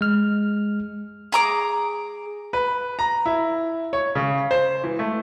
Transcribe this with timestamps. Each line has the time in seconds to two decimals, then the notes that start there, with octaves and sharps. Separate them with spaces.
0.01 G#3 F6
1.32 G#4 A#5 D6
2.53 B4
2.99 A#5
3.26 E4
3.93 C#5
4.15 C#3
4.51 C5
4.84 E3
4.99 A3